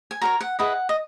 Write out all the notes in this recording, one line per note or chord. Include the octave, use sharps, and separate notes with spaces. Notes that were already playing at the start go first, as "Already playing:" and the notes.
G#5
F#4 A#4 C#5 A#5
F#5
E4 G#4 B4 D#5 F#5
D#5